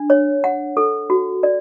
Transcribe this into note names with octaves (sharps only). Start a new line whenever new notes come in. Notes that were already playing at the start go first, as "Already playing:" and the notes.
Already playing: D4
C#5
F#5
A4
F#4
D5